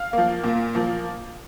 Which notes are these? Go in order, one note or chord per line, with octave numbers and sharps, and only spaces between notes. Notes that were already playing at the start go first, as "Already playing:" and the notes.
Already playing: F5
F3 A#3
A#2
F3 A#3